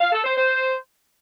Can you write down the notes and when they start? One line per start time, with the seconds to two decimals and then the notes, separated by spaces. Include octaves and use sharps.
0.01 F5
0.12 A4
0.24 C5
0.36 C5